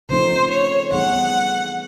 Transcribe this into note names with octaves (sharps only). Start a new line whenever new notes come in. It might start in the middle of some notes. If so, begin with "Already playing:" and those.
C#3 F3 A3 C4 D#4 C5
C#5
E3 G3 B3 D#4 G#4 F#5